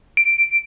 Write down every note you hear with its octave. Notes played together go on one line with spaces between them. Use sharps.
D7